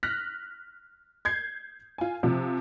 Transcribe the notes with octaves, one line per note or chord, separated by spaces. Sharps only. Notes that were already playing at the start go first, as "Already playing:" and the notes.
F6 F#6 A#6 B6
G6 G#6 C7
F4 G#5
C3 F3